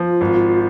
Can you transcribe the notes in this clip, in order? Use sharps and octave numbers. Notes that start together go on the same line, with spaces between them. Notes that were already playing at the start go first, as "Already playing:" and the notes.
Already playing: F3 F4
G#1